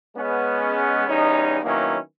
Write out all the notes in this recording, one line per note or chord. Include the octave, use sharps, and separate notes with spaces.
G#3 B3 C#4
E2 G3 C#4 D#4
D#3 F#3 A#3 B3 C#4 E4